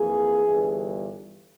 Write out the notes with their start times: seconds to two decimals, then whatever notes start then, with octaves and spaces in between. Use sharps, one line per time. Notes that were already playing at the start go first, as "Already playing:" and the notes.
Already playing: F2 E3 A#3 G#4
0.46 G1 G2 E3